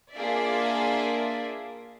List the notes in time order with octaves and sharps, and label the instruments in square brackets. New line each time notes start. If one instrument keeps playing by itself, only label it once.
[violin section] A#3 D4 F4 G#4 D5 E5